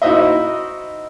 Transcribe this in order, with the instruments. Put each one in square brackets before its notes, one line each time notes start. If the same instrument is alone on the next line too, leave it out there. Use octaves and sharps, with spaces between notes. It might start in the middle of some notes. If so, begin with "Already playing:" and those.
[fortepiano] D#4 E4 F#4 C5 D#5 E5